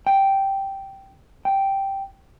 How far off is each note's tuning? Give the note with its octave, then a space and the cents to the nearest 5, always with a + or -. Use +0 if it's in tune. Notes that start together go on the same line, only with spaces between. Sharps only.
G5 -5
G5 -5